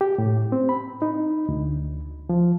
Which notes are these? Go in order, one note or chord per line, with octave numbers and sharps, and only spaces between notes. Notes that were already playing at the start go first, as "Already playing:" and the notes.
G4
A2
C4
B5
D#4
D2
F3